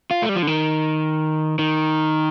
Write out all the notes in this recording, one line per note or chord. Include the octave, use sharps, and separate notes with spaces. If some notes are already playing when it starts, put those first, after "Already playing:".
F4
A3
G3
F3
D3
D#3
D#3